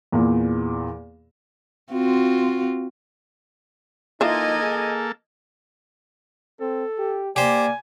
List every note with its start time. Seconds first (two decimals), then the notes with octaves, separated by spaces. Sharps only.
0.12 E2 A#2
1.92 C4 F4 F#4
4.21 E3 A#3 D#4 F4 A4 D#5 E5 G#5
4.62 G#4
6.60 C4 A4
6.98 G4
7.36 A#3 G4 C5 D5 G#5